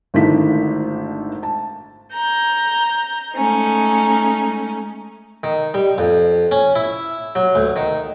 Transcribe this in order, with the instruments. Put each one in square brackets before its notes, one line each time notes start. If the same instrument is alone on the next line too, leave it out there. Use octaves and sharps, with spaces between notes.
[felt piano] G#1 D3 D#3 A3 E4 B6
A5
[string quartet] A#5 G6
G#3 A3 C#4 D#4
[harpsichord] D#3
G3
F2
C#4
E4
F#3
D2
D#3